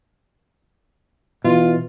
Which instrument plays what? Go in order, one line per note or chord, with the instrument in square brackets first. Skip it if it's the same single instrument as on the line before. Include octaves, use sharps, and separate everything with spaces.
[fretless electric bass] B2 E3 [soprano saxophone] F4